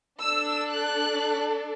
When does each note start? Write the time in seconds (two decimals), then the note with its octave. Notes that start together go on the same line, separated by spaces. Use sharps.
0.21 D4 A4 E6
0.69 F#6